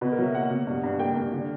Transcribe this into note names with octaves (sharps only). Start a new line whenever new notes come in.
B2 B4
A#4
F#3 E5
A#3 F#5
B2
G2
G2
A#3 G5
G2
D3